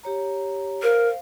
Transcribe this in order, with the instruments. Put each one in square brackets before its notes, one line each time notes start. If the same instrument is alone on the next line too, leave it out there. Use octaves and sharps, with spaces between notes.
[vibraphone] G4 C#5 A#5
[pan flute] A#4 [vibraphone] C5 F5